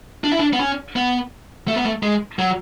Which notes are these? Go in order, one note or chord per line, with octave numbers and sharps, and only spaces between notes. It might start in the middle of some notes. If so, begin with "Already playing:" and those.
D4
E4
D4
B3
C#4
B3
A3
B3
A3
G#3
F#3